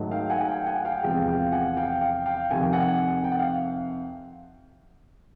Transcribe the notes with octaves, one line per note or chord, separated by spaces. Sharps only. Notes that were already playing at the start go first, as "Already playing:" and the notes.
Already playing: G#2 D#3 F#3 A3
F5 G5
F#5 G#5
G#5
F5 G5
F#5 G#5
F5 G5
E2 C3 F3 G#3 F5 G5
F5 G5
F#5 G#5
F5 G5
F5 G5
F5 G5
F2 C3 D#3 G#5
G5
F#5 G#5
G5
F#5
F5